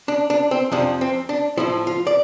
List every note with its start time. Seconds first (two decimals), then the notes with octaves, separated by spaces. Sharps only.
0.08 D4
0.30 D4
0.51 C4
0.72 F2 C3 F3 D4
1.01 C4
1.29 D4
1.57 A2 F3 E4
1.87 F4
2.07 D5